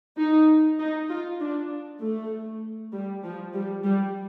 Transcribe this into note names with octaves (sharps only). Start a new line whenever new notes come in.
D#4
D#4
F4
D4
A3
G3
F3
G3
G3